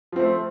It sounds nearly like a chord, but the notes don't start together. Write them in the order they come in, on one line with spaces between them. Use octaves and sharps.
F3 C4 A3